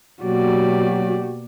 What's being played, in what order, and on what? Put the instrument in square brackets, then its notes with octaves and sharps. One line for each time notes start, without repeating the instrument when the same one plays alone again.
[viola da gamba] B2 A#3 D5 [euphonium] F#3 [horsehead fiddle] F#4 G4